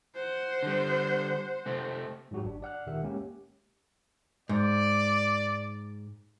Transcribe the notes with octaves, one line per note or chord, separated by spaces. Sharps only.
C5 F#5
D3 G3
C3 A3 C4
G#2 F#3 F#4 G4
G1 D4
D5 F#5 F6 F#6
C#2 A#2 D#3 G4 E5 F#5
G#3 A#3 C#4 G4
G#2 D5